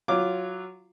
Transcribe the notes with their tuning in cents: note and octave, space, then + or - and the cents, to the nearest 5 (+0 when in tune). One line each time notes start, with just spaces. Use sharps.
F#3 +0 F4 -15 D6 +0